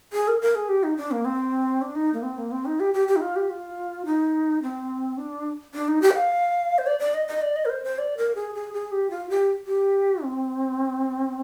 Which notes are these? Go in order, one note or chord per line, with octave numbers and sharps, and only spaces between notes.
G#4
A#4
A#4
G#4
G4
D#4
D4
A#3
C4
D4
D#4
A#3
C4
A#3
C4
D#4
G4
G4
G4
D#4
F4
G4
F4
D#4
C4
D4
D4
D#4
G4
G5
F5
C5
D5
D5
D#5
D#5
D5
D#5
A#4
C5
C5
D5
A#4
G#4
G#4
G#4
G4
F4
G4
G4
C4